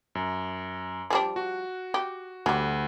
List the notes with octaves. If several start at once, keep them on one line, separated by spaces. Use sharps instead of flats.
F#2
F3 G3 D4
F#4
G4
D2 F#3 G3